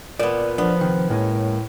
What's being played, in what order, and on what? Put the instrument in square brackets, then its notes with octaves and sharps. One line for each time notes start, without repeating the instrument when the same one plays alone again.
[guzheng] A#2 B3 [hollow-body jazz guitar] D5
[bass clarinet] F3 [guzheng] B3 [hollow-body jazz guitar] D4
[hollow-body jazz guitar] C3 D#3
[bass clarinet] A2 [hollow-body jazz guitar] G#3 A#3 C#4